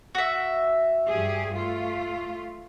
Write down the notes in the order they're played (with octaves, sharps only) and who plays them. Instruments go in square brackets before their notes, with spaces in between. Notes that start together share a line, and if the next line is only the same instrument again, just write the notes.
[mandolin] F#4 E5
[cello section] G2 G4 G#4
A3 F4